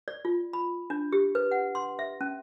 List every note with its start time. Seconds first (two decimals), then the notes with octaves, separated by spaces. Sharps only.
0.08 D5
0.25 F4
0.53 B5
0.90 D4
1.12 G4
1.35 B4
1.51 F#5
1.75 C6
1.99 E5
2.21 C#4